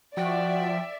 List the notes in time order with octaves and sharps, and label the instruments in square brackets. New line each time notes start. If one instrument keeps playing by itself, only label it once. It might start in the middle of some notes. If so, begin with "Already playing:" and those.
[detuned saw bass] F3 [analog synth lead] F#4 [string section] D5 E5 [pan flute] G5